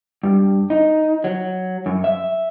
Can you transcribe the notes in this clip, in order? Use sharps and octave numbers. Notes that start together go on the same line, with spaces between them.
G2
D#4
F#3
F#2
E5